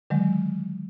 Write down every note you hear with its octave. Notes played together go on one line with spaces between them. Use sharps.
D3 D#3 F#3 G#3